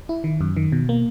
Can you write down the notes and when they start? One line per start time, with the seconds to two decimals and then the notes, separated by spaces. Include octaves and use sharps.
0.09 E4
0.24 D#3
0.41 F#2
0.57 D#3
0.72 B2
0.89 A#3